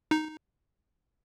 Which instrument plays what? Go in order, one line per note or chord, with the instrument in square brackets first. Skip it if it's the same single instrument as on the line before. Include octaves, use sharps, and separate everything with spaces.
[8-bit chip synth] D#4